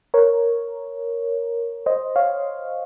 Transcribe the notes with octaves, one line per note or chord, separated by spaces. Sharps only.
A#4 C#5
C5 D#5
C#5 F5